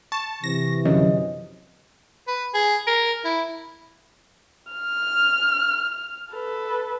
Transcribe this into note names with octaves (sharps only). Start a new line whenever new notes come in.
A5 C#6
C3 E3 A#6
F#2 D3 F3 C#4 D#5
B4
G#4
A#4
E4
F6
A4 B4